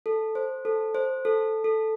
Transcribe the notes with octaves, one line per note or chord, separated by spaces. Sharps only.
A4
C5
A4
C5
A4
A4